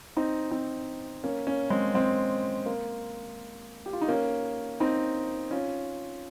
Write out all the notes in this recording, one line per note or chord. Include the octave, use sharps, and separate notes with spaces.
C4 D#4
C4 D#4
A#3 C#4
A#3 C#4
G#3 C4
G#3 C4
A#3
G4
F4
D#4
A#3 C#4
C4 D#4
C#4 F4